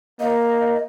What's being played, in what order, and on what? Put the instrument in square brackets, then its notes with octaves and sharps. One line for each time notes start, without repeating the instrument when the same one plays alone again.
[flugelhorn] A#3 [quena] D#5